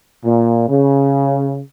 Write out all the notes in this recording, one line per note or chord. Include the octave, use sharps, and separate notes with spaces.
A#2
C#3